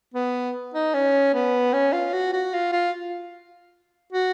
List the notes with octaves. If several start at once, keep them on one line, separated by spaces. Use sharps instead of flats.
B3
D#4
C#4
B3
C#4
F4
F#4
F#4
F4
F4
F#4